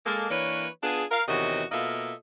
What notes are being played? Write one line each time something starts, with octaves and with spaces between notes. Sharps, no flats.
G#3 A#3 A4
E3 A#3 D4 B4 C#5
B3 D4 F4 G#4
A#4 F5
E2 C3 D#3 F#4 C#5 D#5
B2 A#3 F4 A4 D#5 E5